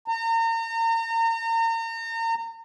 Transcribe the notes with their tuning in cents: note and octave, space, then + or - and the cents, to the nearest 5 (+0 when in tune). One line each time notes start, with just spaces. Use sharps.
A#5 -35